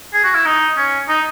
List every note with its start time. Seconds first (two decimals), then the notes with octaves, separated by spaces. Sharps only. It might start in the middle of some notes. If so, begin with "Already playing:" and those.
0.14 G#4
0.24 F#4
0.35 E4
0.46 D#4
0.77 C#4
1.09 D#4